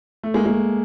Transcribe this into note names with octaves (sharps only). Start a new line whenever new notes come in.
A3
G#3 A#3
G#3 A#3